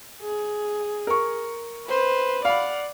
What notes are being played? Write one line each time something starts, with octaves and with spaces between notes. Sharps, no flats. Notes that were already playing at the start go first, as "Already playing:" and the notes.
G#4
A#4 C#6
B4 C5
D5 F5 F#5 B5